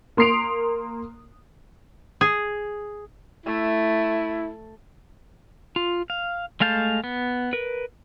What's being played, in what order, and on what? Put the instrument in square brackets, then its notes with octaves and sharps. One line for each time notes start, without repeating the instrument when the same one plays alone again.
[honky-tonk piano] A#3 C6 D#6 C7 D7 F7
[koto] G#4
[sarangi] A3 [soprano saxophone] E4
[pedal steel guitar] F4
F5
G#3 A3 F5 A5 G6
B3
A#4 B4